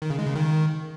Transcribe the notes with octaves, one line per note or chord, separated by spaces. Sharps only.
D#3
C#3
G#3
C#3
D#3